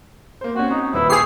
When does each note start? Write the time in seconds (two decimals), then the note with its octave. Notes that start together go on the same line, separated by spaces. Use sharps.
0.41 A#3 C5
0.56 C4 C#4 F#4
0.71 D#4
0.93 D#1 E4 B4
1.10 G4 G#4 C#6 D#6 C7